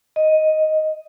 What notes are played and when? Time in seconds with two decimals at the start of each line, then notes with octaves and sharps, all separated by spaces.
0.16 D#5